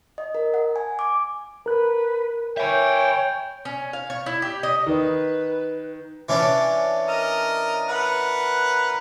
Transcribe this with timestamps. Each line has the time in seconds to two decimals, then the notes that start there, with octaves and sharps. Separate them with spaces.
0.18 D#5
0.35 A#4
0.54 F#5
0.76 G#5
0.99 D6
1.66 A#4 B4 F#6
2.57 C#5 E5 G5 G#5
3.65 C#4
3.93 F5
4.10 C#5
4.26 E4
4.42 G4
4.63 D#5
4.87 D#3 B4
6.29 E3 C#4 D4
7.08 A#4 D#5
7.89 A#4 B4 F#5